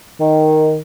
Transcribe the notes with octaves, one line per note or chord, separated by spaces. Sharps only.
D#3